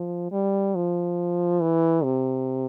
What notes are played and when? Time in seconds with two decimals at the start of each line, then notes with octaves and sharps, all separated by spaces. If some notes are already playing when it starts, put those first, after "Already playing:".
Already playing: F3
0.31 G3
0.75 F3
1.61 E3
2.04 C3